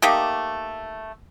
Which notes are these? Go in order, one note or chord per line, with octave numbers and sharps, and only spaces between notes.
A3 A#3 D#4 G4